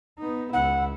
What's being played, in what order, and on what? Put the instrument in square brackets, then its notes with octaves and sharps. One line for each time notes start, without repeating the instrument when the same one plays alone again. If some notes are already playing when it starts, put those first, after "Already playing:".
[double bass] B3 D#4
[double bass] C#2 E4 [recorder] F#5